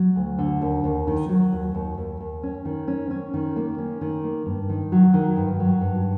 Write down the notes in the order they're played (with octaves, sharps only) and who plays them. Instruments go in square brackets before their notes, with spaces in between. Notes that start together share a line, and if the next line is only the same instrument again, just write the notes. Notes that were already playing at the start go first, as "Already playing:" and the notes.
Already playing: [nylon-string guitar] F#3
D2
D3
D#2
D#2
D#3
F#3
D#2
D#2
D#2
D#2
C#4
D#3
C#4
C#4
D#3
A#3
C#4
D#3
A#3
G2
D#3
F#3
D#3
G2
F#3
G2